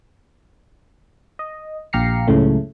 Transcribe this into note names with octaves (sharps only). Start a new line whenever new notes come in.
D#5
A#1 G4 F5 A#5 C7 C#7
C#2 F#2 A2 C#3 A3